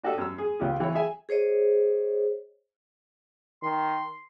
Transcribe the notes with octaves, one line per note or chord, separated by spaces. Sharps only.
D4 F#4 G4 A4 D#5
F#2 A#4 A#5 E6
G#4
C#2 F4 G4
E3 C#5
G#4 E5 G#5
G#4 C5 C#5 D#5
D#3 C6